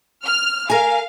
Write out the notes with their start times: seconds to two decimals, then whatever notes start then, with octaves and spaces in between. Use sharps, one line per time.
0.23 F6
0.70 A#4 F5 G#5